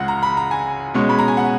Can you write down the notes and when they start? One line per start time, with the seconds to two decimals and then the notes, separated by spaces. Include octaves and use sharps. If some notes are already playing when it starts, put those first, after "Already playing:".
Already playing: C#2 C#3 G#3 F#5
0.08 A#5
0.23 B5
0.37 A#5
0.51 G#5
0.94 B2 G#3 C#4
1.09 B5
1.19 A#5
1.28 G#5
1.37 F#5